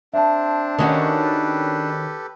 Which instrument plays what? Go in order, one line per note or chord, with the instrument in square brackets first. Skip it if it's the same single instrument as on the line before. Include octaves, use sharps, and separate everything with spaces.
[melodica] C4 C5 [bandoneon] D4 [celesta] E5 A5
[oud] D#3 C#4 F#4 [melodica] G4 A4 B4